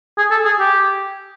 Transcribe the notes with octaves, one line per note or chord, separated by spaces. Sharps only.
G#4
A4
G#4
G4